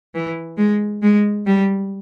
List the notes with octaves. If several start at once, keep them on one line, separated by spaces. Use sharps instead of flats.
E3
G#3
G#3
G3